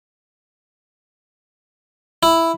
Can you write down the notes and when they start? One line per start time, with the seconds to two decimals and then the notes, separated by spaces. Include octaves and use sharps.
2.23 E4